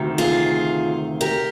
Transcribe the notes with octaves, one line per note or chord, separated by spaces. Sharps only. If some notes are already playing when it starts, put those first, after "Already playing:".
Already playing: D2 C3 D#3
F4 G#4
G4 A#4